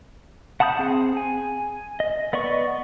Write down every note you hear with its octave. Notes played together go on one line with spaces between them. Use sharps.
F#5 A5 B5 D#6 G6
C4 G#4
G#5
D#5
B3 D5 D#5 C#6